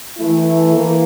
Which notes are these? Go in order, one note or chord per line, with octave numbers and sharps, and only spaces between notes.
E3 A3 E4
E3 A#3